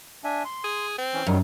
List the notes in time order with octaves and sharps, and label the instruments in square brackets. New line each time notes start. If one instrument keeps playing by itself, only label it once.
[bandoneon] D4 E5 G#5
C6
[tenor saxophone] G#4
C4
[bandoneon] E3 C#4
[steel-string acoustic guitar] F#2 [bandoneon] D#3 F#3 G3